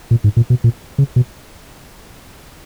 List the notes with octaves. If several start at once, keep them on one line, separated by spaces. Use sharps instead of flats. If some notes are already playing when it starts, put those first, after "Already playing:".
A#2
G#2
A#2
B2
A#2
C#3
B2